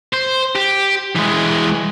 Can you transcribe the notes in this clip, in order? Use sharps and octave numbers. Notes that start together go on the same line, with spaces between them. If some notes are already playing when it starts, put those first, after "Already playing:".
C5
G4
E3 G#3